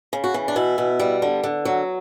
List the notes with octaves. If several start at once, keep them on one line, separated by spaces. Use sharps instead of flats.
C#3
F#4
E3
D4
B2 E4
B2
G3
D3
D3
F#3